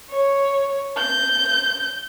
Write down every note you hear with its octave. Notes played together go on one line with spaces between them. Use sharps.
C#5
G6